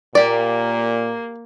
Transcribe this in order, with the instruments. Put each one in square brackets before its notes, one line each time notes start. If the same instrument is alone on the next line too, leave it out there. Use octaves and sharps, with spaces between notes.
[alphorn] A#2 [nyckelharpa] A#3 [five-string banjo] G4 D5